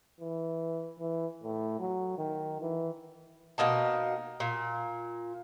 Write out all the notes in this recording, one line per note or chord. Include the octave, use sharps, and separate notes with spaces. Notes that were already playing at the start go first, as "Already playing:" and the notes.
E3
E3
A2
F#3
D#3
E3
B2 A#3 D#4 A5
A#2